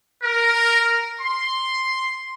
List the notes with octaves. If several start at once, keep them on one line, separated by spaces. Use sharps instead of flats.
A#4
C6